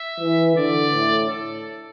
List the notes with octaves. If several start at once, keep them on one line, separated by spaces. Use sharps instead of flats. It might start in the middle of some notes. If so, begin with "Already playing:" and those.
Already playing: E5
E3
D3 D5
A2
A4